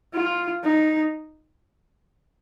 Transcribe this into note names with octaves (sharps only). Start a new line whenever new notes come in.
F4
D#4